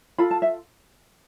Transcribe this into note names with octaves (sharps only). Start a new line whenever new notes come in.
F4 A4 B5
A5
E5